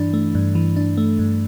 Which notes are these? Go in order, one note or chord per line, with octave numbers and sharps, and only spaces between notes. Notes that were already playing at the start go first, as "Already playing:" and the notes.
Already playing: G2 E3 D4
A3
G2
E3
D4
A3
G2